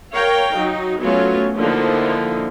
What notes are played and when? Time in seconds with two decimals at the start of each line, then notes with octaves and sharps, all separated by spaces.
0.14 A#4 C#5 F5 G5
0.56 F#3 D#4
1.00 F#3 A3 B3 C#4 F4 C#5
1.58 D3 F3 A#3 D#4 E4